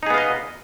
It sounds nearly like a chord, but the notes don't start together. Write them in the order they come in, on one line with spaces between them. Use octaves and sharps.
D#4 G#4 B3 F5 D#5